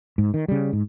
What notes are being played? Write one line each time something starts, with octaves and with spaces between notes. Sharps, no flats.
G#2
D#3
C#3 G3
G#2